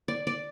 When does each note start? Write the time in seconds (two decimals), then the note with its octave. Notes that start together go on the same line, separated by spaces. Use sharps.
0.08 D5
0.27 D5